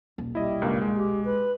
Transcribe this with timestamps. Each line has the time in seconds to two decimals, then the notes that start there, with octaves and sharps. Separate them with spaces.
0.18 D#1 B1
0.35 G3 E4 D#5
0.62 C#2 G2 A#3
0.82 G#3
0.96 G4
1.25 B4